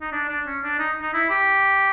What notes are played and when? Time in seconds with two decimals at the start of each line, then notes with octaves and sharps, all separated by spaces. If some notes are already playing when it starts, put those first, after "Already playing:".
0.01 D#4
0.12 D4
0.29 D4
0.47 C#4
0.64 D4
0.80 D#4
1.01 D#4
1.14 E4
1.30 G4